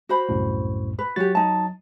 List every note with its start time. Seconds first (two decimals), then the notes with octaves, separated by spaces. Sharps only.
0.09 F#4 C5 B5
0.29 C2 F#2 A2
0.99 B4
1.16 F#3 F#4 G4 A6
1.35 D#4 A5